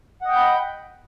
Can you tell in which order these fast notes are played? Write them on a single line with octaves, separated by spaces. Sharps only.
F#5 D#5 G5 G6 B5